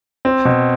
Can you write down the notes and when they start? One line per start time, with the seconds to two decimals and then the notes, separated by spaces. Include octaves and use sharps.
0.25 C4
0.45 B2